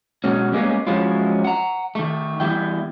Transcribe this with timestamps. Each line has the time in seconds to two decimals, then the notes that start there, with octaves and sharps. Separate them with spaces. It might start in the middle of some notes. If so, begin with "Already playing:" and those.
0.24 B2 F#3 G#3 C#4
0.52 G3 G#3 A#3 B3 C#4
0.87 F3 F#3 G#3 C#4 E4 F4
1.44 F#5 A#5
1.95 D#3 A3
2.40 E2 E3 G3 E4 G5